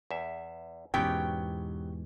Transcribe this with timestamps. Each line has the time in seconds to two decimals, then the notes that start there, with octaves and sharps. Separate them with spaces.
0.11 E2 E5
0.94 E2 G#2 B2 F#3 B3 C#4 G4 G5